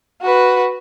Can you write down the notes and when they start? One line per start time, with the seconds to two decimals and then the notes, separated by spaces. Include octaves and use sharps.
0.22 F#4 B4